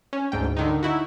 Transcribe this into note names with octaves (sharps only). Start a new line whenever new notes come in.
C#4
D2 G#2 G5
D3 D#3 D#4
D#4 E4 F#4